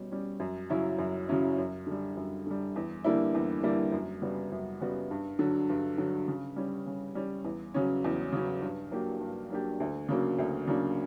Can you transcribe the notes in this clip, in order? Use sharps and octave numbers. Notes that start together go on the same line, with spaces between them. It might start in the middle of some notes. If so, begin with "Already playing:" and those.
Already playing: B2 G3 C#4
G3 C#4
F#2
C#3 F#3 C#4 E4
F#2
C#3 F#3 C#4 E4
F#2
D3 G3
F#2
D3 G3
E2
D3 G3 A#3 E4
E2
D3 G3 A#3 E4
F#2
C#3 G3 B3 F#4
F#2
C#3 G3 B3 F#4
G2
D3 F#3
G2
D3 F#3
C#3
G3 C#4
C#3
G3 C#4
E2
C#3 F#3 C#4
E2
C#3 F#3 C#4
G2
F#3 A#3 D4 G4
G2
F#3 A#3 D4 G4
D2
C#3 F#3 A#3 D4
D2
C#3 F#3 A#3 D4